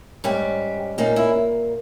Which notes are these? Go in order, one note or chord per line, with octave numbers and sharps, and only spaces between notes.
G#2 G3 C#4 G4
A#2 A#3 C#4 D#4
E4